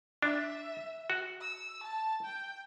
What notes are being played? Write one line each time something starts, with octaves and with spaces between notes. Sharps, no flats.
D4 E5
F#4
E6
A5
G5